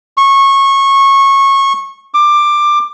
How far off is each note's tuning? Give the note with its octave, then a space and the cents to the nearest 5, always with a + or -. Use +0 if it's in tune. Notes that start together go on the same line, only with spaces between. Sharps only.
C#6 -20
D6 +15